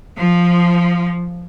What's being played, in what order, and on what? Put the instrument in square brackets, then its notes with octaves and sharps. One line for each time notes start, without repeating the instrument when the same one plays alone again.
[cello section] F3